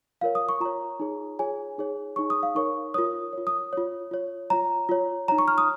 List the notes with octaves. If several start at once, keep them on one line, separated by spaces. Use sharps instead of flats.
F4 A#4 C#5 F5
D#6
C#6
F4 C#5 A#5
D#4 G#4 C#5
F4 G#4 C#5 G#5
D#4 G#4 C#5
D#4 G#4 C#5 C#6
D#6
F5
D#4 A#4 C#5 C#6
F4 A#4 C#5 D#6
F4 C#5
D#6
F4 C#5
F4 C#5
F4 C#5 A#5
F4 C#5
D#4 C#5 A#5
C#6
F6
D#6